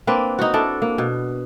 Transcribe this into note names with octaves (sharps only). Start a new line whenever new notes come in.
A#3 C4 D4 B4
D#4 F#4
D4 E4 A4
A#3
B2